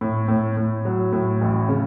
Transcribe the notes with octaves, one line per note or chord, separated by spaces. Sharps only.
A2
A2
A2
F#3
A2
A1
C#3